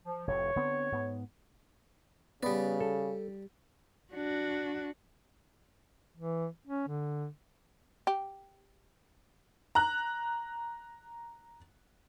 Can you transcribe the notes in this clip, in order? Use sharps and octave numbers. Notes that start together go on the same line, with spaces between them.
F3
F1 A2 C3 C#5
D3 B3 C4
G#2 B3
C#3 G3 B3 D5
A4
D4 F#4
E3
C#4
D3
G4
A#5 F#6